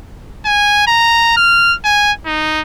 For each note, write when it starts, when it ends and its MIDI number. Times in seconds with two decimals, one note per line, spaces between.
0.45 0.86 80
0.87 1.36 82
1.37 1.75 89
1.84 2.12 80
2.26 2.61 63